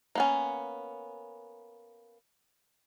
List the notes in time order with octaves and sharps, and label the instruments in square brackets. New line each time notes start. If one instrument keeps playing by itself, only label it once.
[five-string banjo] A#3 B3 C#4